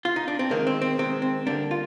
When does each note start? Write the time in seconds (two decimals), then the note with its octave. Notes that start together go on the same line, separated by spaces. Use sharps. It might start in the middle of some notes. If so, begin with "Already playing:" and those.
0.05 F4
0.16 D#4
0.28 D4
0.39 C4
0.50 C3 D#3 G#3 A#3
0.67 C4
0.82 C4
0.98 C3 D#3 G#3 C4
1.22 C4
1.46 D3 G3 A#3 D4
1.71 F4